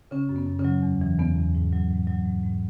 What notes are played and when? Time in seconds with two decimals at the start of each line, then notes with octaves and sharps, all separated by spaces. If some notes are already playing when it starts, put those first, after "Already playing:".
0.11 C#3 C#4
0.29 F#2
0.36 B3
0.47 F#2
0.59 C#3 C#4
0.65 F#3
0.82 E2
1.01 E3
1.19 E2 B3
1.36 E2
1.55 G#2
1.73 F#3
1.90 G#2
2.07 F#3
2.25 G#2
2.43 G#2